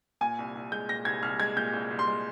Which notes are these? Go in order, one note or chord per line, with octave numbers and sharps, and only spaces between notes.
A#2 G#5
C2
C2
G#3 G6
A#2 A#6
C2 G#6
C2 F6
G#3 G#6
A#2 G6
C2
C2
C6
G#3